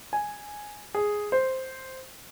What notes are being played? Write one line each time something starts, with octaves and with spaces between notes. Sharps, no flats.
G#5
G#4
C5